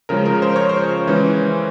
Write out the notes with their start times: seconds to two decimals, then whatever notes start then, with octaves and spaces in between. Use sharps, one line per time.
0.09 C#3 F3 G#3 C#4 A#4
0.26 A#4
0.42 C5
0.56 C#5
0.69 C5
1.07 E3 G#3 C#4